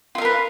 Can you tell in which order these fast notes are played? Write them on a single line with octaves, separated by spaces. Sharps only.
F4 F5 A#4 B4